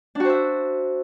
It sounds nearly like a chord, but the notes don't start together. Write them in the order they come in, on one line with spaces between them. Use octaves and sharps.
D4 F#4 C5 E5